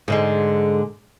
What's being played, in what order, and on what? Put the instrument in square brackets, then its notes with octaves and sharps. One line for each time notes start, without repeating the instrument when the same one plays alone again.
[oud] G#2 D3 G#3